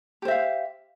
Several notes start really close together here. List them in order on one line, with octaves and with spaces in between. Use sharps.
G4 C5 E5 F5